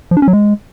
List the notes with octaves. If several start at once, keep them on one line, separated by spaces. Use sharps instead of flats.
F3
D4
C#4
F#3
G#3